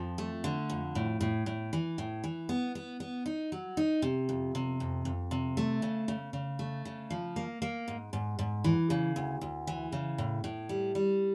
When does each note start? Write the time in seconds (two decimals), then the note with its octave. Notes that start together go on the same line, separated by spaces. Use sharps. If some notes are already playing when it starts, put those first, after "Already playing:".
Already playing: F2 F3
0.18 A3
0.44 D3
0.70 F2
0.95 A2
1.21 A2
1.46 A2
1.73 E3
1.98 A2
2.24 E3
2.49 B3
2.75 B3
3.00 B3
3.26 D#4
3.52 F#3
3.77 D#4
4.02 C3
4.29 F2
4.55 C3
4.80 F2
5.05 F2
5.31 C3
5.57 A3
5.82 C#3
6.08 C#3
6.33 C#3
6.59 A3
6.85 C#3
7.10 F3
7.36 A#3
7.62 A#3
7.88 G#2
8.13 G#2
8.39 G#2
8.64 E3
8.90 C#3
9.16 D2
9.41 D2
9.67 E3
9.92 C#3
10.18 A2
10.44 A2
10.69 G3
10.95 G3